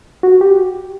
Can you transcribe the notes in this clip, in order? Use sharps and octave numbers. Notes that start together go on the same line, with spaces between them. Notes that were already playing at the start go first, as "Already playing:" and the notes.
F#4
G4